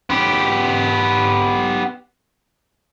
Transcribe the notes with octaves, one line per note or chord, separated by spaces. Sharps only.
B3 G4